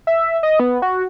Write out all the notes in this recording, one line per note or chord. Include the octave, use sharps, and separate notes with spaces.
E5
D#5
B3
F#4